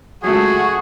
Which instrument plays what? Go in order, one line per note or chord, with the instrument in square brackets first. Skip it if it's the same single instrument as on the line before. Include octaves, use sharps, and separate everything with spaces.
[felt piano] C#2 F#3 [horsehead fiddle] A3 [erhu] F#4 [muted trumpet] G#4